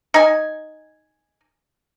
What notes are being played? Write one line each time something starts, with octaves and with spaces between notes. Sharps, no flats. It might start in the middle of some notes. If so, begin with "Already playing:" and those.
D#4 G#5